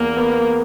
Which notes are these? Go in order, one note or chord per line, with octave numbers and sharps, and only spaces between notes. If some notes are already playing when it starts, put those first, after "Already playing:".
Already playing: E2 A#3
B3